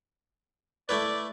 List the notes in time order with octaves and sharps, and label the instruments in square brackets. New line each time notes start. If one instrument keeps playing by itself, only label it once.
[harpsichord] A3 E4 B4 [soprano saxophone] D5